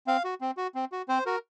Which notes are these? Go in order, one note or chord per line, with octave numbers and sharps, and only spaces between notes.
C4 F5
F#4
C4
F#4
C4
F#4
C4 C5
F#4 A#4